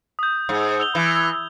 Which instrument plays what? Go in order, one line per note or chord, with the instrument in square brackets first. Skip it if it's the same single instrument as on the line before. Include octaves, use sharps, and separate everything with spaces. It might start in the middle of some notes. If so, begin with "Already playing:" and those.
[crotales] D#6 G6
[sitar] G#2
[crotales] E6 F7 G7
[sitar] E3